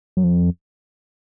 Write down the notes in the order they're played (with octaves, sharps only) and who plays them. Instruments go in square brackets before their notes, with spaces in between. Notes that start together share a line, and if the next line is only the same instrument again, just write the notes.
[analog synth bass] F#2
F2